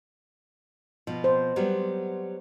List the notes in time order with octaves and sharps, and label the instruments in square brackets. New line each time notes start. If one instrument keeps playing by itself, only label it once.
[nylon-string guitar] B2 F3
[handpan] C5
[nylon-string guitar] F#3 G3 B3